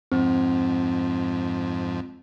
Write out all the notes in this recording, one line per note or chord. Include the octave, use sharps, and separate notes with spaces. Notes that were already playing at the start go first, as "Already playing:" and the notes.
F2 G#2 F3 C4